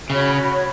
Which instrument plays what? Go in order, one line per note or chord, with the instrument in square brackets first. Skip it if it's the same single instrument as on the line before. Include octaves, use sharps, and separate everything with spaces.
[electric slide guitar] C#3 [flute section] F#4 C#5 B5